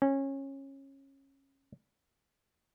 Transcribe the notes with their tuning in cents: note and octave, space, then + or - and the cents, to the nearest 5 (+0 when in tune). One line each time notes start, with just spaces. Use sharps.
C#4 -20